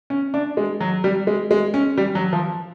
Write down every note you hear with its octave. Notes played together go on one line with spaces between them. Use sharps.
C#4
D4
G#3
F#3
G3
G#3
G#3
C#4
G3
F#3
F3